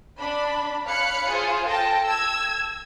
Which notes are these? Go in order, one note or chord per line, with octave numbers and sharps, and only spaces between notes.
D4 B5
C#5 F5 B5 F#6 C#7
F4 G#4 C5
A4 G5 A5 A#6
E6 G#6